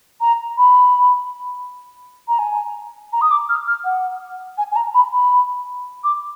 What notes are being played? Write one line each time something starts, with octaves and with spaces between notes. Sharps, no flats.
A#5
B5
A#5
G#5
A#5
D#6
D6
F6
F6
F#5
G#5
G#5
A#5
B5
B5
D6